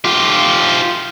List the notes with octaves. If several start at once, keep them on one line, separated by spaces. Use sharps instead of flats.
F4 G4